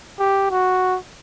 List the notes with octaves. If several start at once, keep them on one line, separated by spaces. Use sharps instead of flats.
G4
F#4